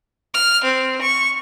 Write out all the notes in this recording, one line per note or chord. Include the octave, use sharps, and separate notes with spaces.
F6
C4
C#6